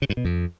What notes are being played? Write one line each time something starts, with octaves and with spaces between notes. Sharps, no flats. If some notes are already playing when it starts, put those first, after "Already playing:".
C#3
G2
B2
F2